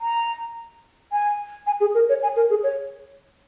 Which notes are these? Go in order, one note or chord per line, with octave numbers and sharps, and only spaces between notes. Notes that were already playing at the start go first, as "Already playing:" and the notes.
A#5
G#5
G#5
G#4
A#4
C#5
G#5
A#4
G#4
C#5